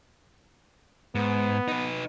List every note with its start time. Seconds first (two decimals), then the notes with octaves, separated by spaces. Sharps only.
1.15 G#2 B3
1.68 D#4 B4